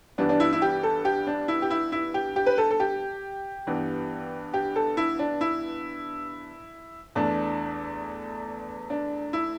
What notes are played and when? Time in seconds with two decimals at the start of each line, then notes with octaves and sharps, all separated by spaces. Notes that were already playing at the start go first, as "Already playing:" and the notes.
0.18 G2 E3 G3 B3 D4
0.29 D4
0.40 E4
0.53 E4
0.62 G4
0.83 A4
1.05 G4
1.27 D4
1.48 E4
1.62 G4
1.70 E4
1.92 E4
2.14 G4
2.36 G4
2.46 B4
2.58 A4
2.71 A4
2.80 G4
3.67 G2 E3 B3
4.54 G4
4.76 A4
4.97 E4
5.19 D4
5.41 E4
7.15 E2 E3 A3 D4
8.90 D4
9.33 E4